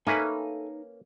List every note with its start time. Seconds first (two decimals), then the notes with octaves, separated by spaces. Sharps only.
0.07 A#3 C#4 D#4 A4 B4 E5 G#5